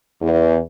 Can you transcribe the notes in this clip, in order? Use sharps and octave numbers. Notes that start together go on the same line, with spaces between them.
E2